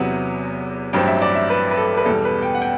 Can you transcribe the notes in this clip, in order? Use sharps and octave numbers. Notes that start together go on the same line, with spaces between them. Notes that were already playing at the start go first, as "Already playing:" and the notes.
Already playing: E2 C3 F#3 B3 F#5
A1 G2 F#3 C4 G5
E5
D5
E5
B4
B4
A4
B4
E2 B2 G3 A4
B4
G5
F#5
G5